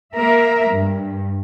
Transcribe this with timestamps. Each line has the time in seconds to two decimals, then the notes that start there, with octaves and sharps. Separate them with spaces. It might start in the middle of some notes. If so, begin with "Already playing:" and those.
0.14 A#3 A#4 E5
0.71 G2